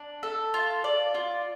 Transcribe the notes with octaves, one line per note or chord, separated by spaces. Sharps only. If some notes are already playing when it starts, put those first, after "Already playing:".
Already playing: D4
A4
F4
D5
F4